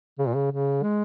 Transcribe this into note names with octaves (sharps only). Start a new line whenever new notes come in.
C#3
A#2
C#3
C#3
G#3